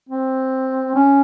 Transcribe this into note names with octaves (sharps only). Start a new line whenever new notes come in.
C4
C#4